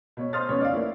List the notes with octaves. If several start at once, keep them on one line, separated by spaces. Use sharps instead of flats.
B2 C#5
C5 C6 D#6 F6 A6
F1 B2 C#4 B4 C#5
D5 F5
A3 A#3 E4